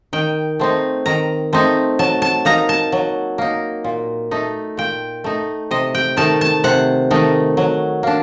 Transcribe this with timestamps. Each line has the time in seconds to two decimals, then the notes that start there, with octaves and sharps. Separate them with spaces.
0.13 D#3 G5
0.60 A3 C4 D#4
1.06 D#3 A#5
1.53 A3 C4 D#4
1.99 F#3 A5
2.22 A5
2.45 A#3 D#4 A#5
2.69 A5
2.92 F#3
3.38 A#3 D#4
3.84 A#2
4.31 A3 D#4
4.77 A#2 G5
5.24 A3 D#4
5.71 C3 D#5
5.95 G5
6.17 D#3 A3 D#4 A5
6.41 A5
6.64 C3 F#5
7.11 D#3 A3 D#4
7.57 F#3
8.03 A#3 D4